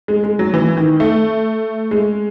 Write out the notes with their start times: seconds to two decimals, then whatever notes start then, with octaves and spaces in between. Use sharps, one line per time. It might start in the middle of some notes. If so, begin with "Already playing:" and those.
0.08 G#3
0.24 G#3
0.39 F#3
0.54 E3
0.77 D#3
1.00 A3
1.91 G#3